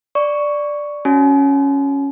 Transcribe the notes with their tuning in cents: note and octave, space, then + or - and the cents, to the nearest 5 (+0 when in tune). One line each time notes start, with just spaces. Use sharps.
D5 +0 C#6 +10
C#4 +0 F#4 +0 G#5 +45